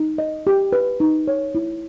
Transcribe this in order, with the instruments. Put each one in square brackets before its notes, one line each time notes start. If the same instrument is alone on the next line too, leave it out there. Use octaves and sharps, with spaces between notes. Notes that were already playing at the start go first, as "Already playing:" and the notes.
Already playing: [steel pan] D#4
D#5
G4
B4
D#4
C#5
E4